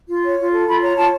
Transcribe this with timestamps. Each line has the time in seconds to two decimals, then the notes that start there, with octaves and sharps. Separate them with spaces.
0.09 F4
0.23 C#5
0.38 F4
0.52 A4
0.67 F4 B5
0.82 C#5 A#5
0.96 F4 A5